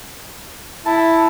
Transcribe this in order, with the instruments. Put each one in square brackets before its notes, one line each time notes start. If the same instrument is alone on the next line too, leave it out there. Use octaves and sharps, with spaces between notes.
[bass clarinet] E4 [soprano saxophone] A5